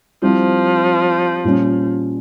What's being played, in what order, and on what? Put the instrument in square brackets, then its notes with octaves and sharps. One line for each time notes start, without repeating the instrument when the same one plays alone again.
[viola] F3 [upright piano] G3 C4 E4
[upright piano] A#2 G3 C#4